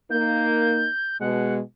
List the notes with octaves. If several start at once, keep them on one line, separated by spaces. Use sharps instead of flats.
A#3 D#4 G6
B2 G#3 F#5